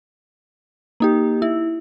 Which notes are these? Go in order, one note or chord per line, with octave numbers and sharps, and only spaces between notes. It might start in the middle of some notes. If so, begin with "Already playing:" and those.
A#3 D#4 G4
E4